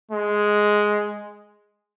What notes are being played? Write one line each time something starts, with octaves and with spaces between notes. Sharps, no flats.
G#3